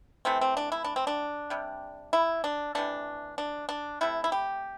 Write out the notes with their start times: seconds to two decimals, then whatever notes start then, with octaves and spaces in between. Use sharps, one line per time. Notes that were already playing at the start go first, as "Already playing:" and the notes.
0.25 C3 E3 A3 C4
0.41 C4
0.57 D4
0.72 E4
0.84 D4
0.96 C4
1.07 D4
1.50 C3 G3
2.13 E4
2.44 D4
2.75 C3 E3 A3 D4
3.38 D4
3.69 D4
4.01 C3 A3 E4
4.24 E4
4.32 G4